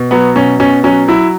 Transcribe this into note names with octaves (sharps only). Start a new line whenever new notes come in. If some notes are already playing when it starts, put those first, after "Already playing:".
Already playing: B2
F#3 B3
B2 C#4
B2 C#4
F#3 C#4
F#3 E4